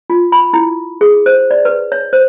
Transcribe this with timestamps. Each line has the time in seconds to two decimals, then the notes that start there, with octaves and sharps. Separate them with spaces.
0.10 F4
0.32 B5
0.53 E4
1.01 G#4
1.26 C5
1.51 D5
1.65 B4
1.92 C#5
2.13 C5